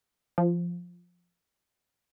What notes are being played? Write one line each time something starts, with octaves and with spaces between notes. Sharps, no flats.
F3